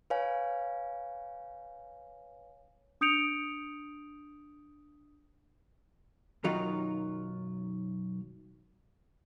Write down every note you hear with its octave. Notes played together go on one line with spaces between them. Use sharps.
B4 C#5 F5 G#5
D4 D#6 G6 C#7 D7 F7
B1 F#2 D#3 F#3 D#4 F4